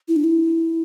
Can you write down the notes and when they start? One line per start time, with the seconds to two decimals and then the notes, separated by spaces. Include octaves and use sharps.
0.08 E4
0.16 D4
0.24 E4